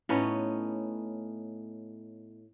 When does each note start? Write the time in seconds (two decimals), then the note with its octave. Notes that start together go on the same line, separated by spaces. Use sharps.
0.09 A2 B3 C#4 D#4